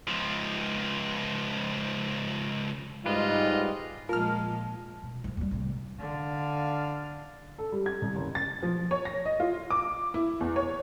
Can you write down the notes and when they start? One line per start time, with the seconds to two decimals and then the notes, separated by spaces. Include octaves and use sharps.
0.08 C#2 F3
3.06 G#2 G3 F4 B4 D#5
4.09 A#2 F3 G#3 F4 A#4 A5 F6
5.03 B2
5.24 F3 F#3
5.37 D#2 G3
5.51 C2 A2
5.99 D3 F5
7.59 A4
7.72 G3
7.86 G#6
8.02 C2
8.16 F#1
8.35 A6
8.63 F3
8.91 C#5
9.05 A#6
9.25 D#5
9.40 F4
9.70 D6
10.14 E4
10.41 E2
10.56 C#5